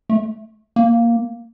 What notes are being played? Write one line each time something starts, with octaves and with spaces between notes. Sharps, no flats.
A3
A#3